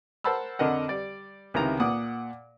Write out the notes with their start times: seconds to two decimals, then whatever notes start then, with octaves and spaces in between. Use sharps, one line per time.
0.24 A#4 C5 F#5 A5 B5 E6
0.59 F2 D3 A#4 D#5 F#5
0.88 G3 D5
1.54 C#2 C3 D#3 E4 B4 A#5
1.80 A#2 F#5 D6 D#6